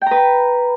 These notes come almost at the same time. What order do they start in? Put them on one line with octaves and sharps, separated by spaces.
G5 A#5 B4 B5